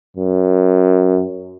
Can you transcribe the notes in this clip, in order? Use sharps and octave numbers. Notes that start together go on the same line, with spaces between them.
F#2